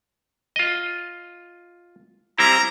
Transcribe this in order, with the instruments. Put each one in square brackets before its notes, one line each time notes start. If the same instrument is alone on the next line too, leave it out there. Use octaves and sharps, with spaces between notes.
[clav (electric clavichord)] F4 D#5
[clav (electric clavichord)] G3 C4 E4 [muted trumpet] A#5